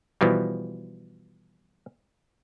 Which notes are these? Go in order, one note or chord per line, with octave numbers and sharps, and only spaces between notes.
B2 E3 F3 G3